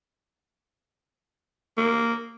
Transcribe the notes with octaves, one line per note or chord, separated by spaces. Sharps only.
A#3